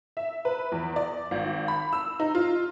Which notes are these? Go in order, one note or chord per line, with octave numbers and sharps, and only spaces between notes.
E5
B4
E2
D5
G#1
B5
E6
D#4
F4